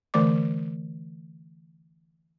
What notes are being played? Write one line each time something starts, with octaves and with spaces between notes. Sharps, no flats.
D3 E3 A3 D5 D6